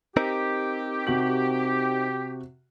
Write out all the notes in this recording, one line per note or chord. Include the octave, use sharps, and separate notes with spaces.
C4 D#4 G4 A#4
C3 F#4 F#7